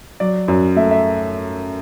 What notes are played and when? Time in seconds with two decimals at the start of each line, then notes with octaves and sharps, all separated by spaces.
0.20 F#3 D5
0.48 F#2
0.76 A3 E5
0.91 E5